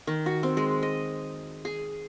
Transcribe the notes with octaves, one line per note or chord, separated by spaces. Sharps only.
D#3
F#4
C4
G#3
D#5
G#4